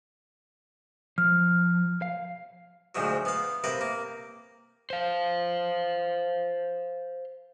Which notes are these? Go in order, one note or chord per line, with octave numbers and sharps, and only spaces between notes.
F3 F6
F5
D2 G#2 F3 F#3
B3 F5
C3 A#4 B4 F5
A#3
C5 F5